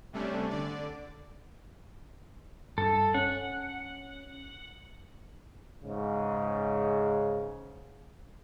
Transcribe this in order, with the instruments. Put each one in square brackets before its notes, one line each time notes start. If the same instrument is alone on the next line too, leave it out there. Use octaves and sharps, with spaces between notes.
[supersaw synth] C3 G3 A3 C#4 D4
D3 D5
[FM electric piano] G2 [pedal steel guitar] A4
[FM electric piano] C#4 [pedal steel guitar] F#5
[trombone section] G#2 C#3